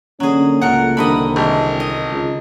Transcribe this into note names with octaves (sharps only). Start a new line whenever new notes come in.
D3 F#3 A#3 C#4 G#4
C#2 A2 A#4 F#5
C2 D3 D#3 D#5 B5
G#1
D#5
C#2